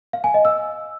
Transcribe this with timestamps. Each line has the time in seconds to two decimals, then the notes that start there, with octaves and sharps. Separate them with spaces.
0.13 F5
0.24 G#5
0.34 D#5
0.45 E6